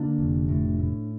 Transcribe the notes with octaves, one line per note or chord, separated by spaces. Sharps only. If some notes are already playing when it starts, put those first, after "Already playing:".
Already playing: D3 A#3 D4
F1
A2
A2